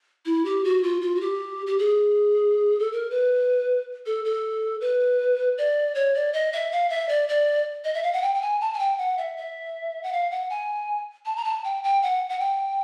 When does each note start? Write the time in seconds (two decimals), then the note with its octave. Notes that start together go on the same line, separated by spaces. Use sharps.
0.26 E4
0.45 G4
0.64 F#4
0.83 F4
1.02 F4
1.15 F#4
1.21 G4
1.67 G4
1.79 G#4
2.80 A4
2.93 A#4
3.10 B4
4.06 A4
4.25 A4
4.81 B4
5.58 D5
5.95 C#5
6.15 D5
6.33 D#5
6.53 E5
6.72 F5
6.90 E5
7.09 D5
7.29 D5
7.84 D#5
7.94 E5
8.03 F5
8.13 F#5
8.22 G5
8.34 G5
8.42 G#5
8.61 A5
8.73 G#5
8.79 G5
8.98 F#5
9.18 E5
9.37 E5
10.03 F#5
10.13 F5
10.31 F#5
10.50 G#5
11.26 A5
11.36 A#5
11.45 A5
11.64 G5
11.84 G5
12.03 F#5
12.30 F#5
12.39 G5